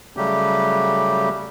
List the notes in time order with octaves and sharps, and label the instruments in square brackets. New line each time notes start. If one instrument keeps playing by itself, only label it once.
[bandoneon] C#3 F#3 G3 A3 G4